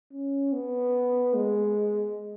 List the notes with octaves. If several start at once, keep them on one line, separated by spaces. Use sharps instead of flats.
C#4
B3
G#3